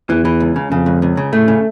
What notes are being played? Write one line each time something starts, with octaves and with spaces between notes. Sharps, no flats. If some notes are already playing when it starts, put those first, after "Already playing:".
E2 E3
E3
C#2
C#3
F2 C#3
C#2
C#2
C#3
A2 A3
C#3